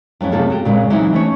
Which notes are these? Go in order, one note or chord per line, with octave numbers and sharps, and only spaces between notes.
F2 F#3 C#4 E4
F#2 C3 A3 F4 G#4 A4
F#4 G4
A#2 C#3 G#3 C4
E3 F#3 C4 C#4 D#4 E4
A3 C#4 B4 C#5